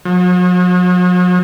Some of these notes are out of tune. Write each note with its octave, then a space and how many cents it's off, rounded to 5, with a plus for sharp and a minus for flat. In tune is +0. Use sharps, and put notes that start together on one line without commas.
F#3 -45